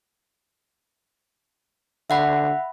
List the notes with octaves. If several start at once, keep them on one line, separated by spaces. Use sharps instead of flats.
D3 E5 F#5 B5